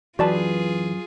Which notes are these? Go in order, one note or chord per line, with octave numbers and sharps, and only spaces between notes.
F#2 E3 F4 F#4 G#4 B4 D5 A5